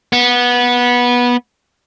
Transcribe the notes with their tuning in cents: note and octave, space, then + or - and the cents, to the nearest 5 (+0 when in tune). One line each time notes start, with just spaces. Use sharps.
B3 -15